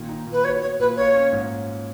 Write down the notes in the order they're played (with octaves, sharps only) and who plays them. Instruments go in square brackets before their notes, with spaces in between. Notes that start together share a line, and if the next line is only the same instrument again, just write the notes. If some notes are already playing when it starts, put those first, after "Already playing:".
Already playing: [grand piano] A#2 D#3
D#4
A#2
[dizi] B4
[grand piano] F#4 [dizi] C#5
[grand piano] B3 [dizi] C#5
[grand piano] A#2 [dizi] B4
[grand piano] F4 [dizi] C#5
[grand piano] C#4
G#2